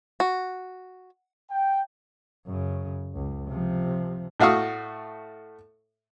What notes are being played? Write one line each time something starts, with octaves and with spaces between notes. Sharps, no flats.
F#4
G5
F#2 C#3
C#2
C3 F3
A2 A3 F#4 F5 C#6 D#6